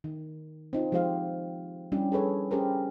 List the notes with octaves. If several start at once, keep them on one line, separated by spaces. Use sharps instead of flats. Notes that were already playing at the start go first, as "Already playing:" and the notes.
D#3
C4 D#4 F4
F3 G#3 G4 C5 F5
G3 C#4 D4 E4 G4
G#4 A4 B4 C#5
C#4 G4 G#4 A#4 C5